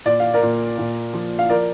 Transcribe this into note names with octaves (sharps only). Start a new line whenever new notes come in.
A#2 D5
F5
A#4 D5
A#2
A#2
F3
F5
F3 A#4 D5